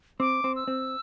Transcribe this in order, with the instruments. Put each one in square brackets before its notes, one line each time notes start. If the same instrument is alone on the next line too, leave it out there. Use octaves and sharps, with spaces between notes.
[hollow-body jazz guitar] C4 [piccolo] D6
[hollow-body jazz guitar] C4
[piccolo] E6
[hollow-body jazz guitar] C4